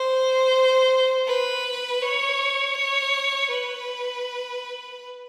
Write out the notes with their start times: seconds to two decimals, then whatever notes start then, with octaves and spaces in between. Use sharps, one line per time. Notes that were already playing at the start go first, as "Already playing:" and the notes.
Already playing: C5
1.27 B4
2.02 C#5
2.77 C#5
3.51 B4